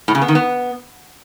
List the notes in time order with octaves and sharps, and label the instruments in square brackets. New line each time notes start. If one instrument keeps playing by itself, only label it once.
[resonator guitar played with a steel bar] A2
C#3
B3
D#3
B3